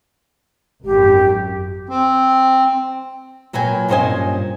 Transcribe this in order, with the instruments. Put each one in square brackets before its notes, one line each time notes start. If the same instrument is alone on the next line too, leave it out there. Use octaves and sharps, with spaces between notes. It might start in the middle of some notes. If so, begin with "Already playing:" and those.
[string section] G#1 F#2 [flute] G4
[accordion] C4
[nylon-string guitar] A#2 F#3 B4 G5 G#5
G2 A#2 C#4 C5 D#5 G#5